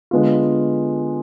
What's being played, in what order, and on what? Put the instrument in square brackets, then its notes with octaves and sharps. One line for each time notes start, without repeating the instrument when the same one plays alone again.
[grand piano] D3 G#3 B3 F4